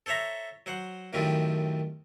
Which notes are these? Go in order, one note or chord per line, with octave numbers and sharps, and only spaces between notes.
A4 C5 C#5 E5 A#5
F#3 C5 F#5
F#2 A2 D#3 F3 G3 C4